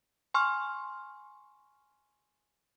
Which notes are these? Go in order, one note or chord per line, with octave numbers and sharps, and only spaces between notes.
G#5 C6 C#6 F6